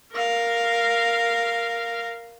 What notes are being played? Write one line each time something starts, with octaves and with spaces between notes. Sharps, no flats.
A#4 F5